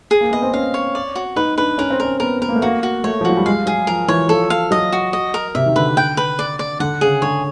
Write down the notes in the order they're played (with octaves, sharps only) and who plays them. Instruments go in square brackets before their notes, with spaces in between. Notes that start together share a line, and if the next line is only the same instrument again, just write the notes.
[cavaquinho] G#4
[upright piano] A#3
[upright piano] B3 [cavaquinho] D#5
[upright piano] C4
[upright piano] C#4 [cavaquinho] F5
[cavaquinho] C#5
D5
F#4
[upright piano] D#4 [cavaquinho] B4
[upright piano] D4 [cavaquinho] B4
[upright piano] C#4 [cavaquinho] A#4
[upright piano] C4
[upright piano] C#4 [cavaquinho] A#4
[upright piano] B3 [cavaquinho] A#4
[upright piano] B3 [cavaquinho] A#4
[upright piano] A#3
A3
[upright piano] A#3 [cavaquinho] F#4
[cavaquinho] F#4
[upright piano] A3 [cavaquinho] C#5
[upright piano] F3
[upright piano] F#3 [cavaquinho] F#4
[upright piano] G3
[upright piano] G#3 [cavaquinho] F5
[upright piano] F#3 [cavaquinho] G#4
[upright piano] F3 [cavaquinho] A#4
[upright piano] E3 [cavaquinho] C#5
[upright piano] F3 [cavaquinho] A4
[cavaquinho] F5
[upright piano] F#3 [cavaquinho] D#5
[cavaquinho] F#4
D#5
A#4
[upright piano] C3 [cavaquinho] E5
[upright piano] D#3
[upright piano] D3 [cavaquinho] B4
[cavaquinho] G5
B4
D5
D5
[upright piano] D3 [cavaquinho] F#5
[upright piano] C#3 [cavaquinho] G#4
[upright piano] D3 [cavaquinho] C#5